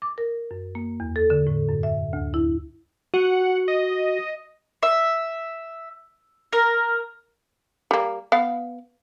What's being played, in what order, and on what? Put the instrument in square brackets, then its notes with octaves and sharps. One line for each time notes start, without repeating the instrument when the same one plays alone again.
[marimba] D6
A#4
F#2
A#3
E2
A4
D3
A2
F#2
E5
D2
E4
[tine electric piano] F#4 [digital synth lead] F#5
[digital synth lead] D#5
[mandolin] E5
A#4
[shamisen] G3 A#3
B3 F5